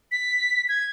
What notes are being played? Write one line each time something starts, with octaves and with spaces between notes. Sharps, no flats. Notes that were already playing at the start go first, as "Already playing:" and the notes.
B6
G#6